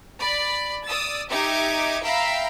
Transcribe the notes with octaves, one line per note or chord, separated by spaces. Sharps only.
D5 B5
D5 D#6 E6 A6
D#4 G4 E5 D6 G#6 C#7
E5 F5 G5 A#5 B5